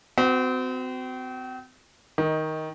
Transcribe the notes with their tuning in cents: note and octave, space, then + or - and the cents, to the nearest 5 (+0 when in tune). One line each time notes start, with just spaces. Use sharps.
C4 -35 F#4 +0
D#3 +10 D#4 +0